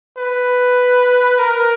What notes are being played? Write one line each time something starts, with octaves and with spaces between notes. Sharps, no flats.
B4
A#4